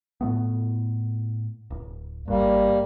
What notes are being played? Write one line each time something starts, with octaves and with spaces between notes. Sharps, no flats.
A2 A3 B3
D1
G#1 G2 G3 A#3